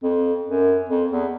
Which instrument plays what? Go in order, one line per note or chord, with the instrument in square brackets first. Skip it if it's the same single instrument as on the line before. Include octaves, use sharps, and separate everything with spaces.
[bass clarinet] F2
F#2
F2
E2